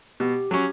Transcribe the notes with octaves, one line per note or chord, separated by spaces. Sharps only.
B2 G4
F#3 C#4